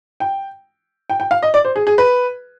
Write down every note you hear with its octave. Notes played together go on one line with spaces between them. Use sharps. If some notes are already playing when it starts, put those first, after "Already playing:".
G5
G5
G5
F5
D#5
D5
C5
G#4
G#4
B4